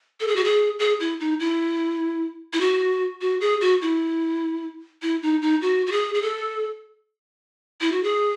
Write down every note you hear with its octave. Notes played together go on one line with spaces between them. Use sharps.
A4
G#4
F#4
G#4
G#4
E4
D#4
E4
E4
F#4
F#4
G#4
F#4
E4
E4
D#4
D#4
F#4
F#4
G#4
G#4
A4
E4
F#4
G#4